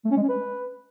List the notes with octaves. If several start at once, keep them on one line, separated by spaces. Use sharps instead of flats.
A3
C#4
G#3
C#4
B4